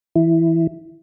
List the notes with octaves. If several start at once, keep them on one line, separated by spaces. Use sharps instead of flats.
E3 E4